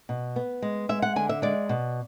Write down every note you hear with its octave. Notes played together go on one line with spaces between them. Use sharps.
B2
B3
G#3
G#3 E5
F#5
D3 G#5
E5
G#3 D5
B2